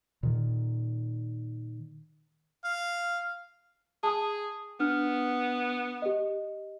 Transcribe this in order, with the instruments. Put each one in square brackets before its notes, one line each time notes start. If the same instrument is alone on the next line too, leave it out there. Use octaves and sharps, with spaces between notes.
[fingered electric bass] A#2 D#3
[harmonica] F5
[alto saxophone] G#4 [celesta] A5 D#6
[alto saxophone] B3 [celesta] D4 F6
[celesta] G4 D#5